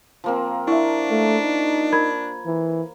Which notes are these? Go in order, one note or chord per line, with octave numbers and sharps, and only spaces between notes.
F3 A#3 C4
D4 E4 E5 C#6
A3
D#4
A#4 B5 G#6
E3